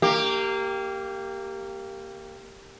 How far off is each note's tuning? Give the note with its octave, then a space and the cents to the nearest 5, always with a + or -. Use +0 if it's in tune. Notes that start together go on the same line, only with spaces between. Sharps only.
A#3 -20 G4 +0